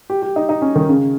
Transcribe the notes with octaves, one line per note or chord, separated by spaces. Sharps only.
G4
G4
D#4
D#4
C#4
D#3
C#3